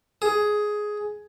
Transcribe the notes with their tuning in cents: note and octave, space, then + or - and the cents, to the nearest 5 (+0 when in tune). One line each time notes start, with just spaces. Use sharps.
G#4 +10